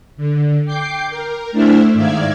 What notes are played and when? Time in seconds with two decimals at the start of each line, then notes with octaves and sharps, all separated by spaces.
0.17 D3
0.65 G5 D6 G6 C7
1.09 A#4
1.52 A3 D4 E4 C5 E5 F6
1.93 G#2 D#3 D5 E5 F5 G#6